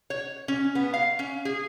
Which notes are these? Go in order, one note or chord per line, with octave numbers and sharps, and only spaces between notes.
C#5
C#4
B3
F5
C#4
G#4